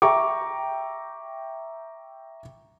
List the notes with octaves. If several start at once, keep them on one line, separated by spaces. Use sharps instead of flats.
E5 G5 A#5 C#6 D6